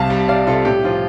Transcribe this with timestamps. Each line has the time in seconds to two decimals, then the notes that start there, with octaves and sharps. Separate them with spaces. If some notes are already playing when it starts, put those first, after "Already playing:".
Already playing: C2 C3 F5 A5
0.10 G3
0.28 G3 D5 F5
0.47 C3 F4 A4
0.65 A2 G4
0.84 F3 F4